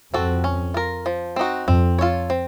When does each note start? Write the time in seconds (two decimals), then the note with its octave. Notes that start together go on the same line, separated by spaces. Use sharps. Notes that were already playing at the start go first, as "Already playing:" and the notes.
0.14 F2 C4 F#4 A4
0.44 C#4
0.74 F4 A#4
1.06 F3
1.36 C4 D#4 F#4
1.68 F2 C4
1.99 F4 A4 C#5
2.30 C4